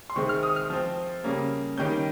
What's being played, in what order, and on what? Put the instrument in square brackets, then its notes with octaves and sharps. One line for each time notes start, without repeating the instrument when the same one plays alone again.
[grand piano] C6
C3 D#3 G#3 C4 C#6
F6
D#6
F6
F3 C4
C#3 G3 A#3 C#4
D#3 G3 A#3 C#4 G6